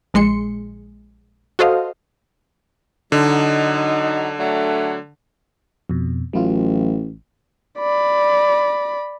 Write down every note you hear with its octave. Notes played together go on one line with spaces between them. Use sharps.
A#1 G#3 C6 C#7
F#4 A4 C5 D#5 F5
D3 F#3 D#4
F#3 A3 D4
F2 B2
A1 F#3 E4 F4
D5 B5